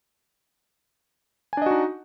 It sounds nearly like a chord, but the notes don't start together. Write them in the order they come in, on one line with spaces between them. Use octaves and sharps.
G#5 D4 D#5 F#4 D#4